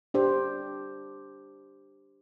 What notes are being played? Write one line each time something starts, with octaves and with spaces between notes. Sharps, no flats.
D4 G4 C5